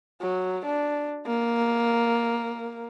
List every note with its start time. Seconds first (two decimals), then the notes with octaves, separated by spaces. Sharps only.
0.21 F#3
0.66 D4
1.26 A#3